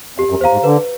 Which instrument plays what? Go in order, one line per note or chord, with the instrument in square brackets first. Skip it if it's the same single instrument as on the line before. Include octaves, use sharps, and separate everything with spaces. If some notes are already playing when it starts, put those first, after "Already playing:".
[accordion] F2 [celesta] G4
[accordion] F#2
[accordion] E2 [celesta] C5 F5 A#5
[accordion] G#2
[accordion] D3 [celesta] B4